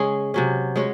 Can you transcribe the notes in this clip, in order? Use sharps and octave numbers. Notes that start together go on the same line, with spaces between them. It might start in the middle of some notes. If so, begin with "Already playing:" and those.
Already playing: C#3 G#3 C#4 G#4
C3 F#3 C#4
G#3 C#4 F#4 C#5